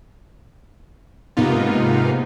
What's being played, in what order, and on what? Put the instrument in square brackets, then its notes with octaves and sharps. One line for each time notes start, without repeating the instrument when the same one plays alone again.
[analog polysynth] G#2 C3 A#3 B3 D#4 F4